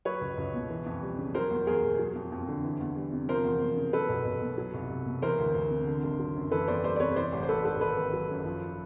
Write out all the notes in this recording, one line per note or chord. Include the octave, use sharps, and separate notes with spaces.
F#3 B4 C#5
C#2
C#2
B2
E3
F2
G3
C#3
F#3 A#4 C5
E2
E2 G#4 A#4
B2
F#3
F2
F2
D3
E3
E2
G3
C3
F3 A#4 C5
E2
E2
C#3
F#3 A4 B4
B1
B1
B2
F#3
C2
C2
B2
E3 A#4 C5
D2
D2
C3
D3
G#1
F#3
F#2
E3 A4 B4
E2 C5 D5
G3 C5 D5
D5
C3 B4 C#5
E3 C5 D5
A1
C5
A1 A4 B4
G#2 A4 B4
D#3 A4 B4
G#1
F#3
F#2
F3